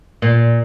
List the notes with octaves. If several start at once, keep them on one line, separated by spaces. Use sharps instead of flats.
A#2